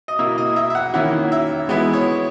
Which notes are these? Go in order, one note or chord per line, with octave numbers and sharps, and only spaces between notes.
D#5
B2 A#3 E4 E5
D#5
E5
E5
F#5
D#3 A#3 C#4 E4 F#5
E5
E3 G#3 B3 E4
C#5